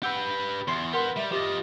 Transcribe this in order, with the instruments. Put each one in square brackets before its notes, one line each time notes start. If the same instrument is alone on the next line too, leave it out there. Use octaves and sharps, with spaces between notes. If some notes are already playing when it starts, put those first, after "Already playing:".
[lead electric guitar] G4 B4 [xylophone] F#5 E6 G6
[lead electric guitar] E2 [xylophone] C6 C7
[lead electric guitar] G4 B4 [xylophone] A#4 F#5 C6
[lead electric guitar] G3 [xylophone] E5
[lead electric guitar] F3 D#5 [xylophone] G4 A6